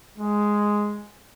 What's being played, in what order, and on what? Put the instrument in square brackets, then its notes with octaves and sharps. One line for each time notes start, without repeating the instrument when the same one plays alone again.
[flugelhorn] G#3